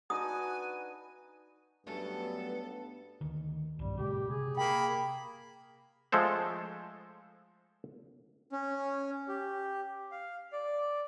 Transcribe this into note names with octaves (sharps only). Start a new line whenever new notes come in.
D4 D#4 F#4 B4 G#5 D#6
G2 F#3 A3 B3 C#4 A4
D2 D#3
B1 G2 G3
A#2 C#3 G#3 G4
C3 G#4
A#3 G5 B5
F3 G#3 A3 A4 C5
C#4
G4
F5
D5